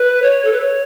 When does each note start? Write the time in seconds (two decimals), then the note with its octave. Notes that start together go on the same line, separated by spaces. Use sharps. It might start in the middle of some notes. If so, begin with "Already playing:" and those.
Already playing: B4
0.22 C#5
0.45 A4
0.53 B4
0.60 C#5